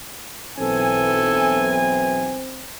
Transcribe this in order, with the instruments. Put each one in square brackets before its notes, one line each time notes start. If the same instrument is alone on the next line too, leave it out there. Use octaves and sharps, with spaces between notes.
[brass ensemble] B1 E3 G#5 [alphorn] C4 [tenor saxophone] A4